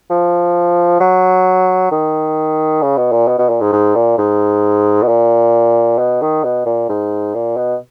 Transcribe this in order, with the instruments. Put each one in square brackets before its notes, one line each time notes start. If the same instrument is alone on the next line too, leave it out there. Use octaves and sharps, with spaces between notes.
[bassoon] F3
F#3
D#3
C#3
B2
A#2
B2
B2
A#2
G#2
G#2
A#2
G#2
B2
A#2
B2
D#3
B2
A#2
G#2
A#2
B2